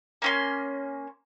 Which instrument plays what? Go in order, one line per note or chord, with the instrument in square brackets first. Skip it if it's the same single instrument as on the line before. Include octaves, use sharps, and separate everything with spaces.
[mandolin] A#3 C#4 C6